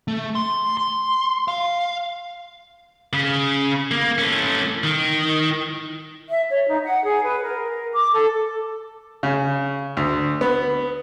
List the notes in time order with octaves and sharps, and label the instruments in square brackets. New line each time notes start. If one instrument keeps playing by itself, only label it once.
[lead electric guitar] A3
C6
C6
F5
[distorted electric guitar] C#3
A#3
A3 C#4
D#3
[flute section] E5
C#5
D#4
F#5
G#4
B4
A#4
D6
A4
[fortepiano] C#3
D2
B3